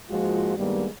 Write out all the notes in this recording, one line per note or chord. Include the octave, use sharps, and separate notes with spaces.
G#2 F3 G#3 A#3 F4 F#4
G2 D#3 G3 G#3 A#3 B3